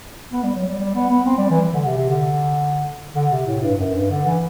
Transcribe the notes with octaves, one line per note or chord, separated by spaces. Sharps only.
B3
G3
F#3
G3
G3
B3
B3
C4
G3
E3
D3
C3
C3
D3
D3
C3
A2
G2
F#2
G2
D3
E3